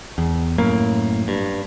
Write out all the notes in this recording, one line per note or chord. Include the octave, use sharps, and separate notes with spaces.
E2
F#2 A2 A#3
G2